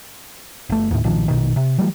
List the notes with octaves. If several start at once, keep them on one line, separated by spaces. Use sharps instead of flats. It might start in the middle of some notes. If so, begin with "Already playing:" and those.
G1 A3
D#2 A2
B1 A#2 D#3 F3
A#1 B2 D#3
C3
E3 F#3 G3 A3